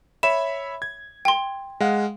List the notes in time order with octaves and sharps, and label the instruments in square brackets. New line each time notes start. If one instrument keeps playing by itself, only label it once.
[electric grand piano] C#5 E5 B5 [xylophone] E7
[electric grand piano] G#6
[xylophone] G5 C6
[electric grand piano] G#3 F5 F#5